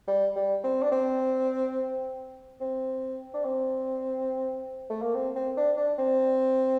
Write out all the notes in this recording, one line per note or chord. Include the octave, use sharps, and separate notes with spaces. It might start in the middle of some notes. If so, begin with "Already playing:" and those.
G3
G3
C4
D4
C4
C4
D4
C4
A3
A#3
C4
C4
D4
D4
C4